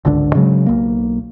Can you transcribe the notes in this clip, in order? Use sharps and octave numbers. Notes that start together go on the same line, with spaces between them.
G#1 C#2 D3 D4
C#3 F#3 G#3
B1 A#3